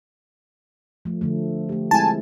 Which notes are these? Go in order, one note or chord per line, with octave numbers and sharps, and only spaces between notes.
F3 A3
D3 F3 A3
A3 G4
G#3 C4 E4 G#5 A5